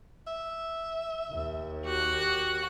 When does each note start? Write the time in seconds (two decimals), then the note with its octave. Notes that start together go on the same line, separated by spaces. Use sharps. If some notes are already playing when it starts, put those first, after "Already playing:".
0.27 E5
1.31 D#2
1.86 F#4 G4 F#6